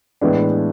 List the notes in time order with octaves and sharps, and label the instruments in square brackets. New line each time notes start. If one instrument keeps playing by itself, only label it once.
[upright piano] A2 E3 G#3 B3 D4